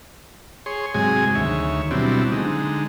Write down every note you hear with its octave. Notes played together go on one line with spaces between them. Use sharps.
G#4 C#5 C6
G#2 C3 F#3 G#3 G#4 G#5
D2 D#3 C#5 E5
B2 F#3 G3 C4 D4 E4
D3 G#3 D#4